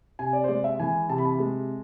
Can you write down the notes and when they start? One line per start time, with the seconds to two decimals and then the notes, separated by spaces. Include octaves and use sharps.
0.19 C3 G#5
0.33 D5
0.44 C5
0.48 G#3 D5
0.64 E5
0.80 E3 G#5
1.09 C3 A5
1.18 B5
1.25 A5
1.40 G#3